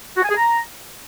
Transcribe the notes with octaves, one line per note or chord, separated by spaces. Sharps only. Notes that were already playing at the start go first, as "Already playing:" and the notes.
F#4
G#5
G#4
A#5